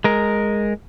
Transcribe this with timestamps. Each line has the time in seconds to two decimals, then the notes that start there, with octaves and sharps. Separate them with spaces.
0.04 G#3 A#4